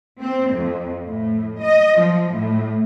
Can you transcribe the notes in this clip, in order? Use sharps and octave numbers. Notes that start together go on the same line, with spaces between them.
C4
F2
A2
D#5
F3
A2